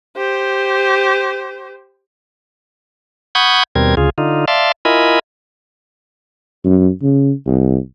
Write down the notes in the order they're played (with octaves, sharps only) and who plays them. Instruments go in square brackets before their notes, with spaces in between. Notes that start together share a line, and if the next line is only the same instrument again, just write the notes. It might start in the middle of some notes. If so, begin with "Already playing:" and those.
[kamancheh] G4 C5
[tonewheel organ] F#5 B5 C#6 D#6 G6 G#6
D#2 B2 G3 C4 A#4 G#6
D2 C#3 F4 G#4
D3 D#4 F4
D5 E5 F5 A5 C6
E4 F4 A#4 D#5 G#5 B5
[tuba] F#2
C#3
C2